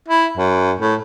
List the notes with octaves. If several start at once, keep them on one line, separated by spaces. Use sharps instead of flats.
E4
F#2
A2